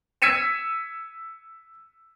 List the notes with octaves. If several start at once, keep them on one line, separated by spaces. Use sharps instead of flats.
E6 G#6 B6 C#7 D#7 E7